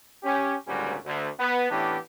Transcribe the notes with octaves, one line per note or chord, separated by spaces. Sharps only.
C#4 G4
G#1 D2 A#2 G3 C#4 F#4
D2
B3
A2 E3 B3 C#4 D4 G4